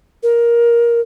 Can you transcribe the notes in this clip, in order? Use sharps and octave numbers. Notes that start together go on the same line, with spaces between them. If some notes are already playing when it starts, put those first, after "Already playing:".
A#4